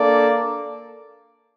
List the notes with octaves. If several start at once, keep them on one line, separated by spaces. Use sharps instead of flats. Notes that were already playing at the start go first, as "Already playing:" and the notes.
Already playing: A#3 D4 A4 D5